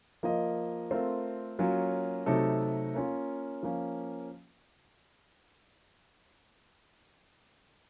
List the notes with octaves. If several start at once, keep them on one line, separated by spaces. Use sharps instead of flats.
F3 A#3 F4 A#4 D#5
A3 C4 F4 A#4
F#3 A#3 C#4 F4
C3 F#3 A3 D#4 A4
A#3 C#4 F4
F3 A#3 C#4